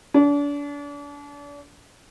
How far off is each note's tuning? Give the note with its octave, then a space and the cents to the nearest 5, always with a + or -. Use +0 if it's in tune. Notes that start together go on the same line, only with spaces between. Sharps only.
D4 -35